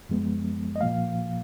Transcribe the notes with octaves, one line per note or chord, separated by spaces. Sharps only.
F#2 F3 G#3 B3
D#5
A#2 F3 A#3 F5